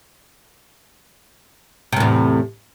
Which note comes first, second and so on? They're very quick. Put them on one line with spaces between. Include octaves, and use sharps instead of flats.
C3 A2 E2